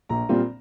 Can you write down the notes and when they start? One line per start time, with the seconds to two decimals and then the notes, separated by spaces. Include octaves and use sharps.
0.09 A#1 A#5
0.29 A#2 G3 C4 F4